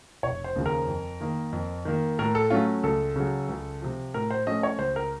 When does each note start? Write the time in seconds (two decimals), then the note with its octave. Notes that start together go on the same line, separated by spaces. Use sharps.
0.23 F1 C#5
0.44 C5
0.56 D#2 C#3 F3
0.66 A#4
0.87 F2
1.21 D#3 A#3
1.53 F2
1.85 D#3 A#3
2.19 A2 A#4
2.35 A4
2.50 F#3 A3 C#4 F4
2.83 C#2 A4
3.16 C#3 F#3
3.49 C#2
3.82 C3 F3
4.14 A2 A#4
4.30 C5
4.46 F3 A3 C#4 D#5
4.63 C#5
4.79 C#2 C5
4.96 A#4